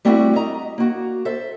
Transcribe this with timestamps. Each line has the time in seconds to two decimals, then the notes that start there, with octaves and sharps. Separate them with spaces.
0.05 G3 A3 C4 E4 F#4
0.35 D#5 A#5
0.78 A#3 F#4
1.25 A4 C5 E5